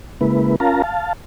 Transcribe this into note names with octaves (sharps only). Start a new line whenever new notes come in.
C#3 G#3 A#3 E4 B4
C#4 F4 A#4 F5 A5 A#5
F5 A5